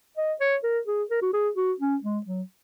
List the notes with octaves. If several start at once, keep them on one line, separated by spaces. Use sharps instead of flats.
D#5
C#5
A#4
G#4
A#4
F#4
G#4
F#4
C#4
G#3
F#3